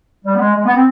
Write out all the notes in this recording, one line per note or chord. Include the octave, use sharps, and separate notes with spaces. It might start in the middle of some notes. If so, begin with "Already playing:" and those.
G3
B3
G#3
G#3
B3
C4